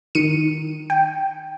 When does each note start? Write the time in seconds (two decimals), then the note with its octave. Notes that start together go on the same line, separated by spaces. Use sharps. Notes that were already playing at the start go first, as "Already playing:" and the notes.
0.15 D#3 C#7 D#7
0.90 G5